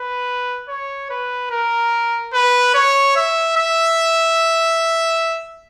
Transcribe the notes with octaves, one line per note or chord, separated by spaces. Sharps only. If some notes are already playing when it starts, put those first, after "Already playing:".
Already playing: B4
C#5
B4
A#4
B4
C#5
E5
E5